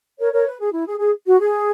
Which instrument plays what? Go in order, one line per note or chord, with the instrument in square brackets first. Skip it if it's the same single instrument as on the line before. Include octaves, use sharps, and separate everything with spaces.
[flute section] A#4 C#5
A#4 C#5
B4
G#4
E4
G#4
G#4
F#4
G#4